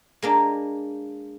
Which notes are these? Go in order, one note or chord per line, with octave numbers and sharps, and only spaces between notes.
G#3 A#3 D4